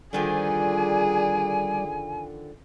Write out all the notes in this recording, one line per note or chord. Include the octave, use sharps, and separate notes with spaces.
D3 D#3 F3 G3 G#4 D5 G#5